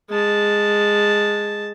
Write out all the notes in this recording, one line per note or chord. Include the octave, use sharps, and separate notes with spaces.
G#3 A5